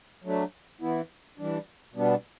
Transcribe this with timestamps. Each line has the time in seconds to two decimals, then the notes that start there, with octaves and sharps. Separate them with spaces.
0.24 F#3 A3 D4
0.81 E3 B3 E4
1.38 E3 G3 D4
1.95 B2 G3 B3 D4